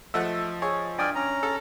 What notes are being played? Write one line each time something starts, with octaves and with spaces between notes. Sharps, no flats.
F3 A3 D#5 F#5 E6 F#6
G#4 C#5 C#6
G2 D5 G5 G#5 D#6 F6
C#4 A#5
A4